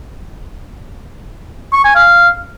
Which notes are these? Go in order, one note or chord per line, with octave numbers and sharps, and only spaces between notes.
C#6
G#5
F5